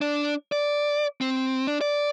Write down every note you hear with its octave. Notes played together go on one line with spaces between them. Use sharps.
D4
D5
C4
D4
D5